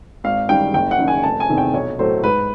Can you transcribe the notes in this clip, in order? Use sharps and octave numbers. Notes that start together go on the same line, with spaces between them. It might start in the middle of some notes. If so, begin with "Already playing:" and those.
G#1 F5
F#2 D#3 G3 G5
F#1 G5
F#5
F#2 D#3
G#5
F1 A5
G#5
E2 C3 D#3
G5
B1 C#5
A2 F#3 A3 C5
G#2 B4